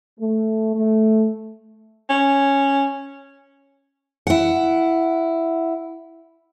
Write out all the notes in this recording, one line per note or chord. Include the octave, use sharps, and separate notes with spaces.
A3
A3
C#4
E4 F#5